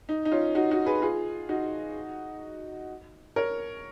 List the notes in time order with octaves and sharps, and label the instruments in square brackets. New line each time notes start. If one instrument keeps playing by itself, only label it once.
[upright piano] D#4
D#4
C#4 F4
D#4 F#4
D#4 F#4
G#4 B4
F4 G#4
D#4 F#4
A#4 C#5